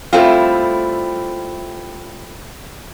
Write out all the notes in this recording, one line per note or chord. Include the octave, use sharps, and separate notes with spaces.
G3 A3 C4 E4 F4